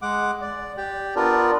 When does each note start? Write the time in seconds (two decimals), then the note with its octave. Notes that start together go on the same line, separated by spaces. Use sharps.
0.02 G#3 F#5 D6
0.41 D5
0.77 G4 D5 G5
1.16 B3 D4 F4 A#4 D5